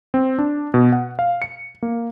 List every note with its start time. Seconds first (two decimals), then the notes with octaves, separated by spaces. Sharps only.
0.14 C4
0.39 D4
0.74 B2
0.92 F#5
1.19 F5
1.42 C#7
1.82 A#3